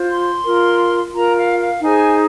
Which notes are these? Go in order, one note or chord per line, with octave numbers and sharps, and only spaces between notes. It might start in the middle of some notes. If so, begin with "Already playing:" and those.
Already playing: F4 C5
C6
F4 A#4
F4 A#4 A#5
F5
F5
D#4 G#4 C5 G#5